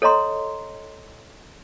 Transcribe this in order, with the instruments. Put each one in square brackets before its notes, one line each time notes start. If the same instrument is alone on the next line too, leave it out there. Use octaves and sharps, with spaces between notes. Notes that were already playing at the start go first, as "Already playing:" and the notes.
[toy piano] A4 C#5 D#5 A#5 C6